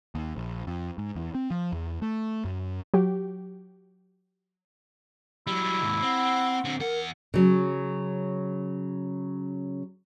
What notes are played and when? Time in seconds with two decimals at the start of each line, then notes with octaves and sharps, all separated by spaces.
0.15 D#2
0.36 A#1
0.67 F2
0.98 G#2
1.15 E2
1.35 C4
1.51 F3
1.72 E2
2.02 A3
2.45 F#2
2.94 F#3 G4
5.47 F#3 G3 E4
5.81 D#2 G#2
6.02 C4 F#5
6.65 D3 C4
6.80 E2 A#4 F#5
7.34 C#3 F#3